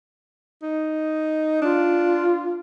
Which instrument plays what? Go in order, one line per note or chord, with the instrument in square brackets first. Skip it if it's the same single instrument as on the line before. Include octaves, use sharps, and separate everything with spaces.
[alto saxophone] D#4
[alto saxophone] D4 [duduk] F4